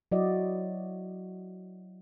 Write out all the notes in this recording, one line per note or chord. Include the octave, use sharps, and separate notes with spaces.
F#3 E4 F#4 D5 D#5